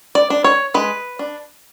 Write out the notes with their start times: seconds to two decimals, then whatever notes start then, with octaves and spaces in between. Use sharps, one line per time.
0.15 D5
0.30 D4
0.44 C#5
0.74 G#3 B4
1.19 D4